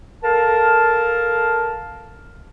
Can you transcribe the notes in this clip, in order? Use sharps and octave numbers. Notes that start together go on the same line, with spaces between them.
A4 A#4 F5 A5